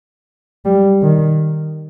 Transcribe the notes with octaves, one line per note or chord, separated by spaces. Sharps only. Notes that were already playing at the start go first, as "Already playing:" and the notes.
G3
D#3